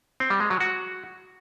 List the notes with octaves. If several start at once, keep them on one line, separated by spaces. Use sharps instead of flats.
C4
G3
G#3
F#3
F#4